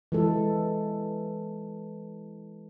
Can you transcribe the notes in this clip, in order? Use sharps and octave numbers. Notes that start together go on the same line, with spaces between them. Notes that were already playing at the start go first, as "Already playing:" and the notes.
E3 G#3 A4